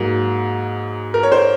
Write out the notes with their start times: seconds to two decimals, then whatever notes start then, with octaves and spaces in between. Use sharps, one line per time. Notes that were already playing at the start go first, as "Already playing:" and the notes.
Already playing: G#2 F#3 A#3 G#4
1.14 A#4
1.23 C#5
1.32 C5